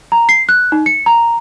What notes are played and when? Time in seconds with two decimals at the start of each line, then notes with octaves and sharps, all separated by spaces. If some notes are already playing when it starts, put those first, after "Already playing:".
0.12 A#5
0.29 C7
0.49 F#6
0.72 D#4
0.86 C#7
1.06 A#5